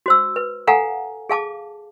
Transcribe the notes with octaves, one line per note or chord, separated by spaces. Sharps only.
F#4 C5 E6
B4
A4 F5 F#5 G#5 A#5
G#4 F5 A5 D6